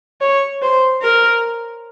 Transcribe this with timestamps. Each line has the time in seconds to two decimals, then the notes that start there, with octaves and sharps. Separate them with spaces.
0.21 C#5
0.62 C5
1.02 A#4